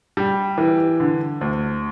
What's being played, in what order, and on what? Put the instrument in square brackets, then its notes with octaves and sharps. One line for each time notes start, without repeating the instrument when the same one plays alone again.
[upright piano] G3
E3
D3
D2